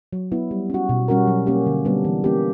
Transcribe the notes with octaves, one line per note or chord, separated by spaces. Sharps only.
F#3
B3 E4
G3
C#4 F#4
B2
G3 C#4 F#4 A#4
F#3
A#3 C#4 G4
D3
G3 B3 D4
E3
A#3 C#4 G4